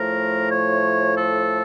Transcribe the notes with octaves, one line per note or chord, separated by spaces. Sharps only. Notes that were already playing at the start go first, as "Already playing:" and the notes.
Already playing: A2 F3 A3 A#4
C#5
A4